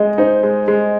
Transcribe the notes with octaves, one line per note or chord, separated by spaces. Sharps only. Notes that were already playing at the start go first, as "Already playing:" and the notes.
Already playing: G#3 D#5
D#4 C5
G#3
G#3